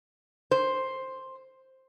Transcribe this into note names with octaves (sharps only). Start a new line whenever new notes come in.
C5